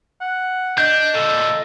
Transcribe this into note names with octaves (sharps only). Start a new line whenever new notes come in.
F#5
D4 D#5 G6
A#2 D3 A4